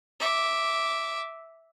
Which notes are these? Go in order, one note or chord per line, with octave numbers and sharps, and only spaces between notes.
E5 D6